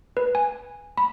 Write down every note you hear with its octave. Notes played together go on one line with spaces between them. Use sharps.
B4
G#5
B5